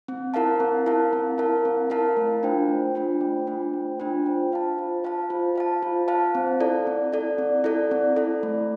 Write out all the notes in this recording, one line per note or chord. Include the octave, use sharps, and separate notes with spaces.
C4
E4 A#4 F5 A5
C4
E4 A#4 F5 A5
C4
E4 A#4 F5 A5
C4
E4 A#4 F5 A5
A3
D4 F4 C5 G5
A3
D4 F4 C5 G5
A3
D4 F4 C5 G5
A3
D4 F4 C5 G5
F4
C5 F5 A5
F4
C5 F5 A5
F4
C5 F5 A5
F4
C5 F5 A5
C4
E4 A4 D5
C4
E4 A4 D5
C4
E4 A4 D5
C4
E4 A4 D5
A3